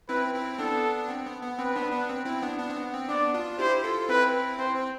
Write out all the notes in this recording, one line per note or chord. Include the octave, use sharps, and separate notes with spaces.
C4 E4 B4
C4 E4
B3 D4 A4
C4
B3
B3
C4 B4
B3 D4
B3 D4
C4
C4 E4
B3 D4
B3 D4
C4
B3
C4
B3 D4 D5
D4 F4
E4 G4 C5
F4 A4
C4 E4 B4
C4 C5
C4